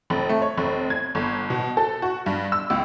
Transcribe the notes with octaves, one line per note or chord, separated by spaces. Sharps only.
F1
A3
C#5
F1
G#6
G1
B2
A4
F#4
G2
E6
C#2